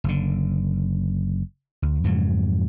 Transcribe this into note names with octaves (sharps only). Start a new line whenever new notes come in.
F#1 D3
D2
F2 G#2 C#3 F#3